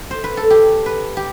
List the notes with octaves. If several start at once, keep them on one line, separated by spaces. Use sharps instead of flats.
C5
B4
A4
G4
B4
G4